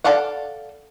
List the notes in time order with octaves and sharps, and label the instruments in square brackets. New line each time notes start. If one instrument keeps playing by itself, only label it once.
[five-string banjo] A4 D5 F5 F#5